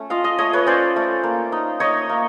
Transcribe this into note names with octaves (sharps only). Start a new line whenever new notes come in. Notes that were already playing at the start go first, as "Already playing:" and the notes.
Already playing: A3 C#4
F4 D#5 F5
D#5 F5
A3 C#5 D#5
B4 C#5
C#4 C5 D5
A3
A#3
D#4
D#4 C#5 D#5
A#3